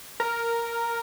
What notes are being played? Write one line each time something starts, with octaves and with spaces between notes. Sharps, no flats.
A#4